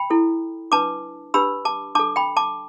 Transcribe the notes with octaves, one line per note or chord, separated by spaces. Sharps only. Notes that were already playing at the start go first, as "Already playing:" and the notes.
Already playing: G5 B5
E4 A4
D4 B4 A5 D6
D4 G4 B4 B5 E6
A5 D6
D4 A4 A5 D6
G5 B5
A5 D6